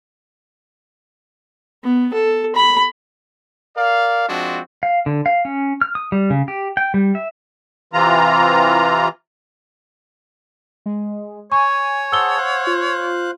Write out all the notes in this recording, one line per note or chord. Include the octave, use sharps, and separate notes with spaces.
B3
A4
B5
A#4 D5 F5
F3 G#3 C4 D4 F#4
F5
D3
F5
C#4
F6
D#6
G3
C#3
G4
G5
G3
E5
C3 E3 F4 A#5
G#3
C#5 G#5 C#6
G#4 C5 F#5 A5 E6 G7
C5 F5 F#6
F4